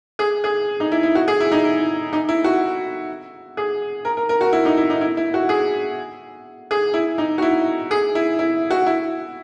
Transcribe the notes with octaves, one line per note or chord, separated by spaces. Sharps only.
G#4
G#4
D#4
E4
E4
F#4
G#4
E4
D#4
E4
D#4
E4
F#4
G#4
A#4
A#4
A#4
F#4
E4
D#4
E4
D#4
E4
E4
F#4
G#4
G#4
E4
D#4
F#4
E4
G#4
E4
E4
F#4
E4